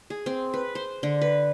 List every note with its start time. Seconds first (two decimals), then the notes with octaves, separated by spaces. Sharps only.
0.10 G#4
0.26 C4
0.54 B4
0.75 C5
1.03 D3
1.21 B4